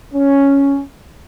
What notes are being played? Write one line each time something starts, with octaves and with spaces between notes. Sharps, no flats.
C#4